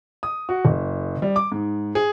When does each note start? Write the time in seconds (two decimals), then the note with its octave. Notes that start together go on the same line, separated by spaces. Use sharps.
0.23 D#6
0.49 F#4
0.65 F#1
1.22 G3
1.36 D6
1.52 G#2
1.95 G#4